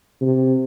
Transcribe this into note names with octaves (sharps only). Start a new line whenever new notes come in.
C3